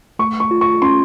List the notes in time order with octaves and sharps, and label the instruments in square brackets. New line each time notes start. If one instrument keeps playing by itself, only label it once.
[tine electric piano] A3 [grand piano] C#6
[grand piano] C#6
[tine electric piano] F4
[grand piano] C#6
[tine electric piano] C#4 [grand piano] C6